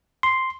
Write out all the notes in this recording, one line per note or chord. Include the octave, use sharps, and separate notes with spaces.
C6